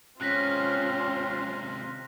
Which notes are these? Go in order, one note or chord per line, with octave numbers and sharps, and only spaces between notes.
C3 G#3 C4 C#4 F4 F#6 A#6 B6